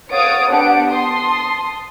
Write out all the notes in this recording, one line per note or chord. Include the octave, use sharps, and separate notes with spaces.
C#5 F5 F#5 D#6 A6 D7
B3 D4 G4 F#5 A5 D7
A5 C6 D#6